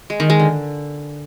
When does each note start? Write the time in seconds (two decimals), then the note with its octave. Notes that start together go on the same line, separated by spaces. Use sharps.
0.10 G#3
0.20 D#3
0.30 G#3
0.40 D3